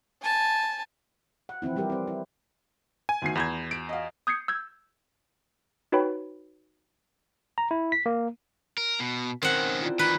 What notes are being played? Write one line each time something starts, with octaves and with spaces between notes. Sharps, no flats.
G#5 A5
F#5
E3 F3 C4 E4
E3 G3 E4 G4 A#4
C4 C5
E4
G#5
D2 D#3 C7
E2 B5 G6 G#6
D7
D#5 F5
D#6 G6 G#6 C7 C#7
E6 G6 G#6
D#4 F#4 B4 C#5 G5 B5
A#5
E4
B6
A#3
A#4
B2
D#3 C4 C#4 A#4 C5 F#5
E4 F4 D5
D#3 E3 B4 A#5